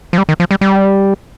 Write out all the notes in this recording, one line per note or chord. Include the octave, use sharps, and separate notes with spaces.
F3
G3
D#3
F3
G3
G3